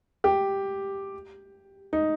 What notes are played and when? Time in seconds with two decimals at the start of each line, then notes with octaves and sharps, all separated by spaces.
0.24 G4
1.93 D#4